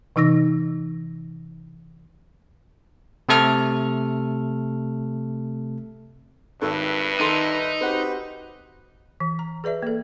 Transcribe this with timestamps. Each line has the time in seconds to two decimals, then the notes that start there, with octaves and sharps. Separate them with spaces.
0.16 C3 E3 D#4 E6 A#6
3.29 C3 A3 A4 F6
6.61 G#1 G2 D#3 A4 B4 E5
7.20 D#3 D#4 A4 C6
7.81 C4 F#4 G4 B4
9.20 E3
9.39 A#5
9.64 G#4 B4 D5 E5
9.83 A#3 A4